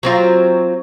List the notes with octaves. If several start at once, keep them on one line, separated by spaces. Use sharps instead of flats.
F#3 C4 F4